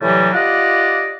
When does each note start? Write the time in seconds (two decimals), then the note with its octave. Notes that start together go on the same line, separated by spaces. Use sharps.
0.02 A2 C3 E3 F#3 G3
0.34 F4 G4 D5 D#5 F#5